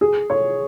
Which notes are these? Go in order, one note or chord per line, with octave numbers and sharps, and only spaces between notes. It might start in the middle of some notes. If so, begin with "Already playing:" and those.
G#4
C#5